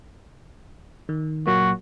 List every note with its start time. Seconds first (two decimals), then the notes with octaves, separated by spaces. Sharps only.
1.09 D#3
1.47 A#2 F#3 A#3 F#4